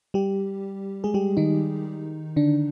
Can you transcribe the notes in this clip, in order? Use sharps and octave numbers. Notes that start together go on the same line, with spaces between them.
G3 G4
G#3 G#4
G3 G4
D#3 D#4
D3 D4